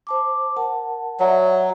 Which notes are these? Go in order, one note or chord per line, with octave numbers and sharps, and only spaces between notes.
C5 A5 D6
A#4 F#5 A5
F#3 D5 E5 F#5